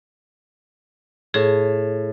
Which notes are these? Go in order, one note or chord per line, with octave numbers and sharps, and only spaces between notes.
A2 G#4